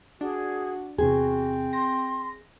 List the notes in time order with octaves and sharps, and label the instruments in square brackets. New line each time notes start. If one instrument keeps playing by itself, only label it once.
[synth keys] D4 [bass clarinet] F#4 [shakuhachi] G#4
[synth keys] E2 C3 [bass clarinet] C4 [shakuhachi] F#4 [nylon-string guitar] G#4
[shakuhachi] C6 [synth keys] A#6